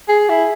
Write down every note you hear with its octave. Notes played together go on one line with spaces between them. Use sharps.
G#4
E4